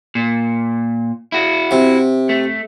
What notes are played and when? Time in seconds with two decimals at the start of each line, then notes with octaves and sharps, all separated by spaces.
0.15 A#2
1.32 E4 F#4
1.71 C3
2.29 A3